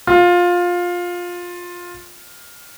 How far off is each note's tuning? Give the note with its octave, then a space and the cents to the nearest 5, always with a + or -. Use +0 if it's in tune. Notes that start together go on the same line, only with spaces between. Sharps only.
F4 +15